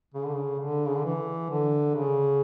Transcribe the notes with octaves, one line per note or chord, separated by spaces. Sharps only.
C#3
D3
C#3
D3
C#3
D3
E3
D3
C#3